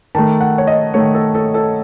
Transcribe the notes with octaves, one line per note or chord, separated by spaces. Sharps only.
D#3 A3 A5
F#5
C#5
D#5
D#3 A3 C#5
A4
A4
A4